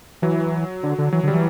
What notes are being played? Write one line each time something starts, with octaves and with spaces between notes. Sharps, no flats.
E3 F#3
D3
D3
E3 F#3
D3
G3
E3